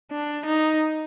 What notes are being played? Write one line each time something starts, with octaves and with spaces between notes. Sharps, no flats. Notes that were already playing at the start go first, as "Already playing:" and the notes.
D4
D#4